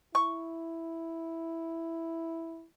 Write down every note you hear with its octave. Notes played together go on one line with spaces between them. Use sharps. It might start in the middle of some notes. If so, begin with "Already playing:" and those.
E4 C#6